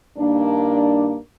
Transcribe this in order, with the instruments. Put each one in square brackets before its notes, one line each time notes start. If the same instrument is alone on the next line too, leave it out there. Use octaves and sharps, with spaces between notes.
[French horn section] G2 D#3 A#3 D4